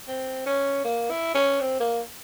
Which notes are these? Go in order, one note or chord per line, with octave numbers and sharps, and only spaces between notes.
C4
C#4
A#3
E4
C#4
C4
A#3